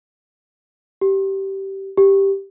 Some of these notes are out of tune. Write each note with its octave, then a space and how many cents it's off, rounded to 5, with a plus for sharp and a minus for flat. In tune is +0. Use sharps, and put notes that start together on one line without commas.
G4 -15
G4 +0